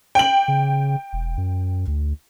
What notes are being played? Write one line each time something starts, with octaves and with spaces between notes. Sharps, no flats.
G5 F#7
C#3
E1
F#2
D2